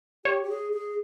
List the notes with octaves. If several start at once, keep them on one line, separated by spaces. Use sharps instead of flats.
G4 C#5
G4
G#4
G#4